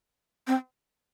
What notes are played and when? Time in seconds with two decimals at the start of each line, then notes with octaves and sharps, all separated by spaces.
0.47 C4